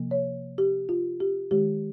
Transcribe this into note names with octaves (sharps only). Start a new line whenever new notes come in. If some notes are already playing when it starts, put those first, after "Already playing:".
Already playing: C3 F3 A#3
C#5
G4
F4
G4
D#3 G#3 G4